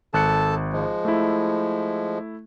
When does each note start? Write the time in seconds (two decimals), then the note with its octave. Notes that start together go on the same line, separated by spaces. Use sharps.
0.14 G#1 A4 A5 F#6 C#7
0.73 F3 G#3
1.05 A3 E4